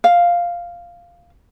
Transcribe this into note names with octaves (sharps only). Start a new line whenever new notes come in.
F5